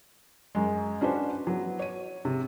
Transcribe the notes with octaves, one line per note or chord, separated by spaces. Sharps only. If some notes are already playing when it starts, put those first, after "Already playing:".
F#2 G#3
C#4 D4 F#4 B4 C5
F#3 B3
C#5 D#7
C3